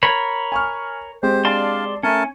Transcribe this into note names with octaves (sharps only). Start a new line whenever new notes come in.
A#4 C#5 B5
G#5 C#6 F6
G#3 C4 G4 C5
D4 D5 F5 A5 C6
A3 C#4 A#4 A5